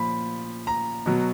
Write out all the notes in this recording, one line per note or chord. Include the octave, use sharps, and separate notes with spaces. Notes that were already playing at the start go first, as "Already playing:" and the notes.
Already playing: A#2 F3 B5
A#5
B2 F#3